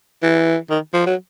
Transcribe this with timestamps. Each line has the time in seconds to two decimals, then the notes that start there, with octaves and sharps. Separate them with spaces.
0.23 E3
0.70 D#3
0.94 F3
1.06 F#3